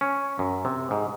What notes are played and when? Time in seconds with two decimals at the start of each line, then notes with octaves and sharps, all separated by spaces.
0.01 C#4
0.39 F#2
0.65 C3
0.91 G#2